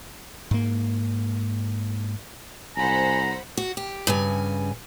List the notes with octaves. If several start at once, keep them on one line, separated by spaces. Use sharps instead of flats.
G#2 A#3
C2 C5 F#5 G#5 A#5 B5
F#4
G4
G2 C#3 G#5